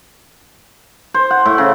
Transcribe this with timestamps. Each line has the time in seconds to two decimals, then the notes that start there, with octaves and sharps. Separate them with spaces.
1.14 C5
1.31 F#5
1.46 A2
1.58 C#3